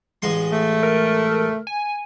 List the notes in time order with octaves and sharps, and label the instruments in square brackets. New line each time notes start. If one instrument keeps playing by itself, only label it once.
[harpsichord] A1 G#3 C6
[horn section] A3
[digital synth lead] A#4
G#5